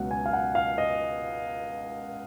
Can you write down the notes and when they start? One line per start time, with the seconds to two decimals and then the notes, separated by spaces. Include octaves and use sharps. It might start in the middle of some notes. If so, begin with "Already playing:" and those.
Already playing: C#2 B2 F#3 F#5
0.11 G#5
0.26 F5
0.33 F#5
0.55 F5
0.78 D#5